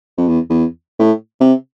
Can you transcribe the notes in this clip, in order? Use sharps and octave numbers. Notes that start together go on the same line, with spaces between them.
F2
E2
E2
A2
C3